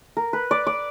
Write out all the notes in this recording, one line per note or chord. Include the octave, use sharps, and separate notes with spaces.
A#4
B4
D5
D5